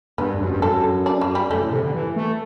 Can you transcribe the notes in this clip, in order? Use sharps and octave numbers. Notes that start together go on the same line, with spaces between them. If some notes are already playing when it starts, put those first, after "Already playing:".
G2 B3
F#2
G2
F#2 A4
D4
F#3
G3
F#2 A3
A2
C3
D3
E3
A3